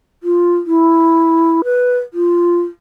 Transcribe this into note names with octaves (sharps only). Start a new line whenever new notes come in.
F4
E4
B4
F4